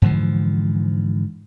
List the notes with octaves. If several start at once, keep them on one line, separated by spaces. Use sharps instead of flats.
G#2 D3 E3 F3